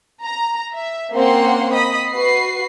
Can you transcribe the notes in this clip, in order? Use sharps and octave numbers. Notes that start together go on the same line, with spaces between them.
A#5
E5
A#3 C4 C#4 F#5 C6
D#5 B5 D#6
F#4 B4 C7